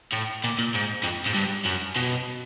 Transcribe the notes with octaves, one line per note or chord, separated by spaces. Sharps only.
A2
A#2
A#2
G#2
F2
G#2
G2
F#2
B2